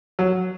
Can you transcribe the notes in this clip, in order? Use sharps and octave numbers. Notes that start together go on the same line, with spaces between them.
F#3